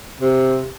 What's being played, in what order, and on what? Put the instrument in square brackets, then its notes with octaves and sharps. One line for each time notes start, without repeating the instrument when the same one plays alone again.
[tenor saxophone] C3